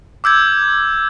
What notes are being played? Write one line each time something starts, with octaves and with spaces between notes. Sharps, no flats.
D6 E6 G6 G#6